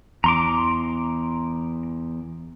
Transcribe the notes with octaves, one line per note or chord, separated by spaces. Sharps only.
E2 A#5 C6 D6